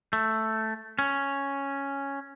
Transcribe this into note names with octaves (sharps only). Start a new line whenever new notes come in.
A3
C#4